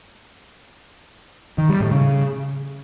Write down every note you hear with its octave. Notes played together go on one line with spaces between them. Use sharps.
D#3
G3
A2
C#3